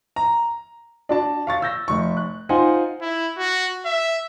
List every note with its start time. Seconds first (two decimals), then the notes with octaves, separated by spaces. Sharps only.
0.16 A#5
1.09 D4 F#4 A5
1.47 F5 C#6 A6
1.62 E6 G6 A#6
1.88 F1 C#6
2.17 F#6
2.49 D#4 F4 C5 F#5 G#5
3.02 E4
3.38 F#4
3.85 E5